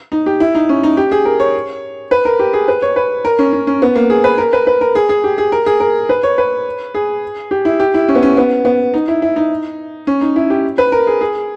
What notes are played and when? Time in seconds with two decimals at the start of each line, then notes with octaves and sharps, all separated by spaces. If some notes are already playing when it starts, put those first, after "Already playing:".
0.12 D#4
0.26 G4
0.40 E4
0.55 D#4
0.69 C#4
0.83 D#4
0.97 G4
1.12 G#4
1.25 A#4
1.40 C#5
2.11 B4
2.25 A#4
2.39 G4
2.53 G#4
2.68 B4
2.82 C#5
2.96 B4
3.25 A#4
3.39 C#4
3.53 C#4
3.67 C#4
3.82 B3
3.95 A#3
4.10 G#4
4.24 B4
4.38 A#4
4.53 B4
4.67 B4
4.81 A#4
4.95 G#4
5.09 G#4
5.24 G4
5.38 G#4
5.52 A#4
5.66 G#4
5.80 A#4
6.09 B4
6.23 C#5
6.38 B4
6.94 G#4
7.51 G4
7.65 E4
7.80 G4
7.94 E4
8.08 C#4
8.15 B3
8.23 C#4
8.37 B3
8.65 B3
8.94 D#4
9.08 E4
9.22 E4
9.36 D#4
10.07 C#4
10.21 D#4
10.36 E4
10.50 G4
10.78 B4
10.92 A#4
11.07 G#4
11.21 G#4